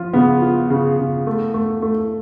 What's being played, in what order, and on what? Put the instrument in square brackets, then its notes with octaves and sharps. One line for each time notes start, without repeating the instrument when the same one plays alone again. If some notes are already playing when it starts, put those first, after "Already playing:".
Already playing: [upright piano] F3 F4
[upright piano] C#3 [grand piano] B3
[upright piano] F4
C#3
C#3
A3
A3
A3